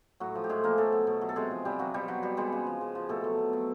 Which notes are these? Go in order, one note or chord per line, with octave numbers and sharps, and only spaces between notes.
A2 F#3 F#4
F3
G4
A2 G#3 G#4
F3 A#3 A#4
B2 A3 A4
F#3
B2
F#3
A4
C3 G#3 G#4
F3
C3 G3 G4
F3 F#3 F#4
B2 G3 G4
F#3 G3 F#4
B2 G3 G4
G3 G#3 G#4
C#3
F3
C#3
F3
B2 A3 A4
F#3
B2
F#3